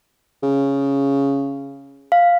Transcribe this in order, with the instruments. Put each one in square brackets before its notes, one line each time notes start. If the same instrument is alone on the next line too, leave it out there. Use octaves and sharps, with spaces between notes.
[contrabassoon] C#3
[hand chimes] F5